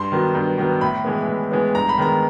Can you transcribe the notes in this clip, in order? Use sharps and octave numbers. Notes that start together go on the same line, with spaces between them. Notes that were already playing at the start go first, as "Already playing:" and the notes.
Already playing: G2 C6
D#3 F#3 B3
G2
D#3 F#3 B3
A2 B5
E3 G#3 B3
A2
E3 G#3 B3
G2 A#5
B5
D#3 G#3 B3 A#5